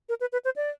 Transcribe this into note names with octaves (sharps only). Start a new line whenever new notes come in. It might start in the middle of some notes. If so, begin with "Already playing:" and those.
A#4
B4
B4
C5
D5